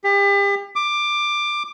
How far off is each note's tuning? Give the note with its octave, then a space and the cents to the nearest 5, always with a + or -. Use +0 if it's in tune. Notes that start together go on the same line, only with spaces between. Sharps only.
G4 +35
D6 +15